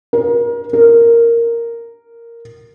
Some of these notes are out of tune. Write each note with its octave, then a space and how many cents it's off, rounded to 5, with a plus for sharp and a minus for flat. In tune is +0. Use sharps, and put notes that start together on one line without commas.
A#4 +30
A#4 -5